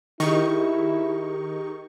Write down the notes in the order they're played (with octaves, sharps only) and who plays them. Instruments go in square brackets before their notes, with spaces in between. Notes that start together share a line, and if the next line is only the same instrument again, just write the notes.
[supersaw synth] D#3 D#4 C#6 [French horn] E4 [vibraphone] G4 G#4 A#4